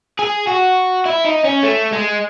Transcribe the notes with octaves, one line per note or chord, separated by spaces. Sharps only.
G#4
F#4
E4
D#4
C#4
A3
G#3